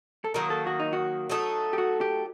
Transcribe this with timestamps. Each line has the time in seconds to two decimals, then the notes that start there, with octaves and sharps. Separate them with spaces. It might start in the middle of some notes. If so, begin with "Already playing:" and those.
0.24 A4
0.34 D#3 F#3 A#3 A#4
0.50 A4
0.67 F#4
0.80 D#4
0.93 F#4
1.30 F#3 A3 D#4 A4
1.73 G4
1.78 F#4
2.01 G4